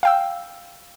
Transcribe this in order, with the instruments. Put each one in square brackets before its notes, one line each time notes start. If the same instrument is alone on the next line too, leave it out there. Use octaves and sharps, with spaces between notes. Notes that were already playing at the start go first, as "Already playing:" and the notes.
[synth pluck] F5 G5 E6